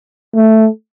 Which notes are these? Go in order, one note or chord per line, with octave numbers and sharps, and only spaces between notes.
A3